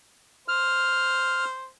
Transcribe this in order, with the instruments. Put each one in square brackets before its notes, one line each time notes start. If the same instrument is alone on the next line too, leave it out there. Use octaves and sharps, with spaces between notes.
[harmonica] C5 [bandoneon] F6